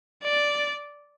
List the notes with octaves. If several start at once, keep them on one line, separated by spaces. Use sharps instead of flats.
D5